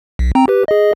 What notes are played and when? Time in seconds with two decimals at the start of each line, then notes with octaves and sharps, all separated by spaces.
0.19 B1
0.35 C4 G5 A#5
0.48 G4 B4
0.68 G#4 D#5